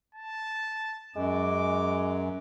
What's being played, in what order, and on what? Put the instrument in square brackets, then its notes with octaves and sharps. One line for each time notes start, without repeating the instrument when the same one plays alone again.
[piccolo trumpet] A5
[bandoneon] F#2 [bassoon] G#3 [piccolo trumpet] D6